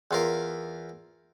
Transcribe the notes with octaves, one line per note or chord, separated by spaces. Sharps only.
E2 F4 A#4